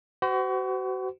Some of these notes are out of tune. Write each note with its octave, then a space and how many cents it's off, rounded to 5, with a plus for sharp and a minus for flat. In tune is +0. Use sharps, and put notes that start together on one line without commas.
F#4 +30 C5 -40